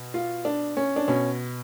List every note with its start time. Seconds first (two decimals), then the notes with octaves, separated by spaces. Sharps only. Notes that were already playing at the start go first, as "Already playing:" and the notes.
Already playing: B2
0.14 F4
0.45 D4
0.77 C#4
0.96 D4
1.08 B2 C#4